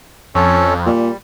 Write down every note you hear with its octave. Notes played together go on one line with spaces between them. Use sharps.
F2 C#4 A4 C#5
A#2 G3